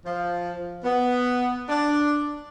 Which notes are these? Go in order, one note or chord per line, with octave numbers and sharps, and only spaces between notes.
F3
B3
D4